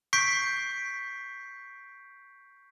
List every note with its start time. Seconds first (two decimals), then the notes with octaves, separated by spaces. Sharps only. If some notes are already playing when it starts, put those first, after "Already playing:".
0.13 C#6 G6 B6 C7 D7